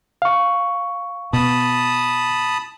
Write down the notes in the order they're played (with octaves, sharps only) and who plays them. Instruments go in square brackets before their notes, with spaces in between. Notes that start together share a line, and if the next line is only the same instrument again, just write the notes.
[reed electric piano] F5 C#6
[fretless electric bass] B2 [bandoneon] A5 B5 D#6